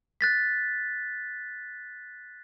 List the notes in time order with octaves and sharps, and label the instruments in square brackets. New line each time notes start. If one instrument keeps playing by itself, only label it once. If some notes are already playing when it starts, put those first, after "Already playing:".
[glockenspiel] F#6 A6 B6